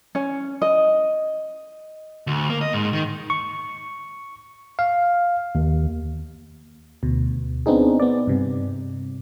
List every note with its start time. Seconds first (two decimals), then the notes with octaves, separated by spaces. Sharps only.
0.15 C#4
0.62 D#5
2.27 D2
2.50 A#3
2.61 D#5
2.73 G#2
2.93 D#3
3.30 C#6
4.79 F5
5.55 D#2
7.03 D2 B2
7.66 B3 C4 D4 D#4 G#4
8.00 B3 D5
8.27 G2 C3